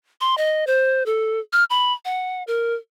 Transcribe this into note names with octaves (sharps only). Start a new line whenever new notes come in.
C6
D#5
C5
A4
F6
B5
F#5
A#4